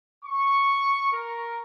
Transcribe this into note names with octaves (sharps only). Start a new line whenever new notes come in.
C#6
A#4